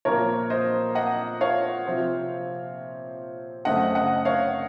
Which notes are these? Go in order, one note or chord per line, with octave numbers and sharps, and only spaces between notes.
A#2 F3 A#3 A#4 C#5
C5 D#5
D#5 F#5
C#5 F5
C3 F3 C4
F#2 C#3 A3 C4 D#5 F#5
D#5 F#5
C#5 F5